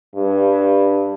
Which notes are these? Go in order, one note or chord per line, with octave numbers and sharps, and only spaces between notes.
G2